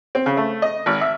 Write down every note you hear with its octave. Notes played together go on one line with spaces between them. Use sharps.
C4
C#3
A3
D#5
G#1
E5